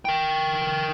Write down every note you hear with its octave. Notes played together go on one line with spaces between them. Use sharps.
A#4 G5